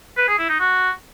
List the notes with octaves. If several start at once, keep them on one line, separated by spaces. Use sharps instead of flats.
B4
G#4
E4
D#4
F#4